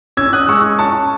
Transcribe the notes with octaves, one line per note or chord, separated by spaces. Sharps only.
C#4 E6 G#6
D#6 F#6
G#3 C#6 E6
C#4 A5 C#6